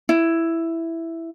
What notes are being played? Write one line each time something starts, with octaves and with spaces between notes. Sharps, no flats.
E4